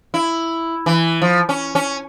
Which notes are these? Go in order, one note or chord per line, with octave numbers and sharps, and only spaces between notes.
E4
E3
F3
C#4
C#4